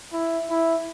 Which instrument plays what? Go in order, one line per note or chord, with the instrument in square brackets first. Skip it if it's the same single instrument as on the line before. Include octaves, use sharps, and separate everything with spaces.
[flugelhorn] E4
E4